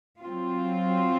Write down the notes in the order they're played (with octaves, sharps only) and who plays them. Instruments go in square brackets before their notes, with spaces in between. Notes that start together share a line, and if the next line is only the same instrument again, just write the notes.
[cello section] F#3 C4 F4